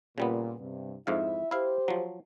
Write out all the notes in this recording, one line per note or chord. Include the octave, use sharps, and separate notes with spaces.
A#2 C#3 G3 B3
G2 C3
F2 G#2 E4 E5 F5
E4 G4 C5 F5
F3 F#3